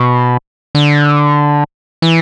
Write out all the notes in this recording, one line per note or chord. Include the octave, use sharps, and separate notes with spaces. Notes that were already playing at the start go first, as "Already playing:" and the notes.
Already playing: B2
D3
E3